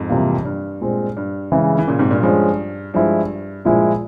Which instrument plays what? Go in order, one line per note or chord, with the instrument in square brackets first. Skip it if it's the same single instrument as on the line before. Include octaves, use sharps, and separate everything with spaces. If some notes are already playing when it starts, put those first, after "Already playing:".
Already playing: [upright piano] F2 G#2
[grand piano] C3 E3 G3 A#3 F4
[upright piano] G2
[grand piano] A#2 G#3 C4
[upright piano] G2
[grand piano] C#3 E3 G#3 E4
[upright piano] E3
A#2 C#3
G#2 C3
G2 A#2
[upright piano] G2 [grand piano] F3 G#3 C#4
[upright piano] G2 [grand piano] F3 G#3 E4
[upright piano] G2 [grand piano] A#2 F3 G#3 E4